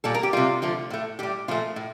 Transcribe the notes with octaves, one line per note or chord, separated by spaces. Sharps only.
A#2 G3 A4
A#4
G4
C3 G3 F4
D3 F3 A3
A2 A3
A2 G3 G4
A#2 F3 A3 F4
A2